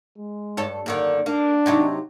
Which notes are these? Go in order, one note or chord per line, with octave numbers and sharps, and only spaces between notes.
G#3
G2 A4 C#5
F#2 D3 D#3 A#3
A#3 D4
C3 F#3 D#4